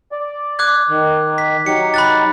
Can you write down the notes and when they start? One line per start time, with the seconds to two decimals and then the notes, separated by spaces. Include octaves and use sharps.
0.12 D5
0.59 D6 F#6 G#6
0.89 D#3
1.38 B6
1.66 F#3 D#4 G4 C#7
1.94 B5 F#6 A6